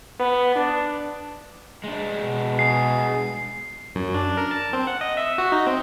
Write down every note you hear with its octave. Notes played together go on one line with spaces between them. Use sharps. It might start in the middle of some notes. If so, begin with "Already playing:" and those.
B3
D4
G#3 D4
B2
G#4 C7
F#2
D4
A#4
A5
C4
F#5
D#5
E5
F#4
D#4
C4